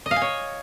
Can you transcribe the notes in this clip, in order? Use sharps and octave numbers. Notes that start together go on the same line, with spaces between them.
D#5
F5
G#5
C#5